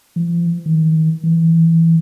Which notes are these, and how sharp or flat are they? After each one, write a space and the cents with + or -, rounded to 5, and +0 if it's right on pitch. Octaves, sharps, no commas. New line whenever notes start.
F3 -35
D#3 +35
E3 +0